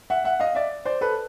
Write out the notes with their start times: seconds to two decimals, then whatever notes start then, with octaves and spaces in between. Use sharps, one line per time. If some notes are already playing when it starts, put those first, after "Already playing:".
0.10 E5 F#5
0.24 E5 F#5
0.40 D#5 F5
0.55 D5 E5
0.85 C5 D5
1.01 A4 B4